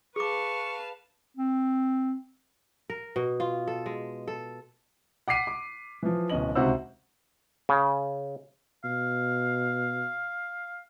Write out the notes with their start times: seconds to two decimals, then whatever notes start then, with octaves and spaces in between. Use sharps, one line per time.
0.16 G#4 B4 F5 A5 C#6 D6
1.37 C4
2.90 A#4
3.16 B2
3.40 F4
3.67 A4
3.86 G#3
4.28 A4
5.28 F#5 D6 B6 C7 D#7
5.47 D6
6.03 E3 F3
6.30 D1 B2 C#4 D#5 F#7
6.55 C#2 C3 D#4 F#4 C5 E6
7.69 C#3
8.84 B2 F5